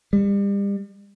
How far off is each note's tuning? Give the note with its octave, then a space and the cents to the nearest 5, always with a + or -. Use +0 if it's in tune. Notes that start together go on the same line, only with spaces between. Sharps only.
G3 +35